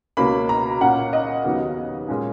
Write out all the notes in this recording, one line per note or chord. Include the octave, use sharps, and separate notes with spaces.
C#2 B2 A#3 C#4 B5
A#5
A#2 A#3 C#4 F#5
D#5
D#2 C#3 F#3 B3
A#2 G#3 C#4